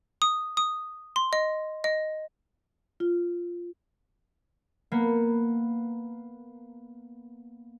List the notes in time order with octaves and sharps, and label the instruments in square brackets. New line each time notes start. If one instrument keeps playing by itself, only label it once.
[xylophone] D#6
D#6
C6
D#5
D#5
[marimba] F4
[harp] A#3 B3